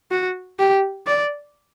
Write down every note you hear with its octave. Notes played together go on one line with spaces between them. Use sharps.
F#4
G4
D5